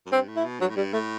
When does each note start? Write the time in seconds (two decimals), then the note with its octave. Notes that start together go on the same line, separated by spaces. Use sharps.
0.06 F#2
0.11 G2 C4
0.28 A2
0.37 E4
0.44 B2
0.60 G2 F#3
0.70 A2
0.76 G2 G3
0.93 A2 A3